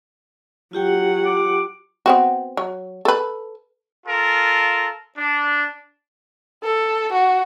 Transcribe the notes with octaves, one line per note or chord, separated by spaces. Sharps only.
F#3 F4 G4 F#5 G5
D6
B3 C4 F#4
F#3
A4 B4
F4 A4 A#4
D4
A4
F#4